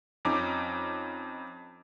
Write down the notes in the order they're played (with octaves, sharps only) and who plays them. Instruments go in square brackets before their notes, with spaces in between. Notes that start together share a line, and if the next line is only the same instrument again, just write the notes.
[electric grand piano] F2 C#4 D#4 D6